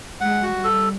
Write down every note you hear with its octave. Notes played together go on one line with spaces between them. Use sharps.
G#3 F#5
F#4
G3
A4